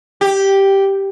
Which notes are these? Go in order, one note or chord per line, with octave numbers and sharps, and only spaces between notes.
G4